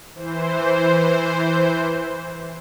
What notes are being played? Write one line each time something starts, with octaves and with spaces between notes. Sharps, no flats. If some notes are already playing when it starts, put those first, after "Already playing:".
E3 C5